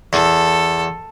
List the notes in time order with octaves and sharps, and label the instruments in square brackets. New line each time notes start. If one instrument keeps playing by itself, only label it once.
[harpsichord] E2 [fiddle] A4